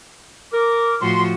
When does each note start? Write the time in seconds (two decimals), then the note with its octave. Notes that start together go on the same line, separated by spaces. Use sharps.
0.53 A#4 D6
1.01 A2 F3 F#4 C6